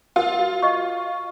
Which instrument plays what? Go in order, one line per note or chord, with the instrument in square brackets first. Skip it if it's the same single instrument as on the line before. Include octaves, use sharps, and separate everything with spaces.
[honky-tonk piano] F4 [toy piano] A#4
[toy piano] F#4
D#5 C#6